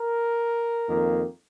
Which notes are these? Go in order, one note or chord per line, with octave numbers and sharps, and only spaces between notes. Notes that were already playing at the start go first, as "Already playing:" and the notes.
Already playing: A#4
F2 D#3 A#3